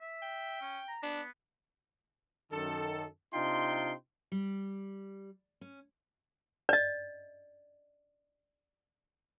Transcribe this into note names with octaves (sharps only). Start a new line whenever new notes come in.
E5
G5
C#4
A#5
B3 D4
F#2 D#3 A4
C3 D4 D#4 F4 G5 C6
G3
C#4
D5 D#5